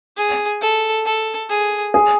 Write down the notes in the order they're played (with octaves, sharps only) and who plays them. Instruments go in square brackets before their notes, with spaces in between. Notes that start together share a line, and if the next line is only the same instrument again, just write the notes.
[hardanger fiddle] G#4
A4
A4
G#4
[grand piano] G#4